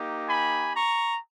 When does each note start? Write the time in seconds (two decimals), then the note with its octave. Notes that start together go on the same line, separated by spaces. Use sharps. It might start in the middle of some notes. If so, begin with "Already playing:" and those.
Already playing: A#3 D#4 G4
0.27 G#5 B5
0.74 A#5 C#6